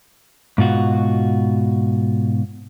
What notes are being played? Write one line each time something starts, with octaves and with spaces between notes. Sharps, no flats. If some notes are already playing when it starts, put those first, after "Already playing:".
G#2 B2 F4 F#4